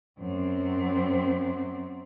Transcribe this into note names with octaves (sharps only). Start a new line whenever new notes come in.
F#2 C4